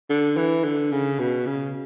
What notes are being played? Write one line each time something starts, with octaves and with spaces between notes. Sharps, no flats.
D3
E3
D3
C#3
B2
C#3